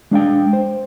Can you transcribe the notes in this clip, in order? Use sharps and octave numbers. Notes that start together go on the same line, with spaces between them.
G#3 D4 F5 G5
C5